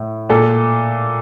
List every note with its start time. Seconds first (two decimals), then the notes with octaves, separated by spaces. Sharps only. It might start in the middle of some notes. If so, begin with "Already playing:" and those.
Already playing: A2
0.29 A#2 A4